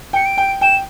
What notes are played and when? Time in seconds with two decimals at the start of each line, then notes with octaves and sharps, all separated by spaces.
0.13 G5 C#7
0.25 D7
0.38 G5
0.61 G5 E7